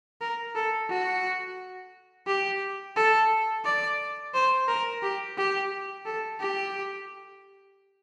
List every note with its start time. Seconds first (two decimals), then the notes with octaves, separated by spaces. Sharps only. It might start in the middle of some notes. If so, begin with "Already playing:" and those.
0.21 A#4
0.55 A4
0.89 F#4
2.27 G4
2.96 A4
3.65 D5
4.34 C5
4.68 A#4
5.03 G4
5.37 G4
6.06 A4
6.40 G4